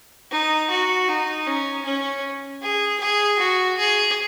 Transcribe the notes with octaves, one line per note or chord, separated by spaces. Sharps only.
D#4
F#4
D#4
C#4
C#4
G#4
G#4
F#4
G#4